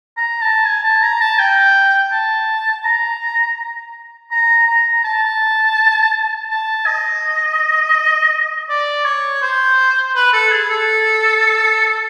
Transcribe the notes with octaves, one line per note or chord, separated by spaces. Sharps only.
A#5
A5
G#5
A5
A#5
A5
G5
A5
A#5
A#5
A#5
A5
A5
D#5
D5
C#5
C5
B4
A4
G#4
A4